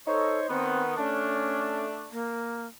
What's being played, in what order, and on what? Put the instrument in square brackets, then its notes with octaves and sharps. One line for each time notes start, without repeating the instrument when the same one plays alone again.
[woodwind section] D#4 C5 C#5 [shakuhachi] A4
[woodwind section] D#3 B3 [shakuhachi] C4
[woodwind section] A3 D4 [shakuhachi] C#4
[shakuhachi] A#3